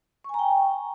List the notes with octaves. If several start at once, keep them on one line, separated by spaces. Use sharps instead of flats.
G5 G#5 A#5 C#6